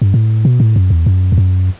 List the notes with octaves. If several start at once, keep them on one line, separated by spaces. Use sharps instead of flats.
G2
A2
B2
A2
F#2
E2
F#2
E2
F#2